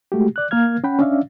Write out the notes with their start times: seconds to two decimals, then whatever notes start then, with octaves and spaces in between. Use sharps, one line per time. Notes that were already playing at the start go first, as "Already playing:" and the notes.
0.12 G#3 A3 F#4 G4
0.36 D5 F#6
0.51 A#3 A#4 F5 F6 G#6
0.84 C#4 F#5 G5 B5
0.99 C#4 D4 D5 E5 F5